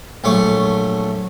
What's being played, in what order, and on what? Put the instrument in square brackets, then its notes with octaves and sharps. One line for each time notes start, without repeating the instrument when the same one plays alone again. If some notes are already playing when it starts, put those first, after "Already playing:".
[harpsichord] A#1 F#3 A3 C#6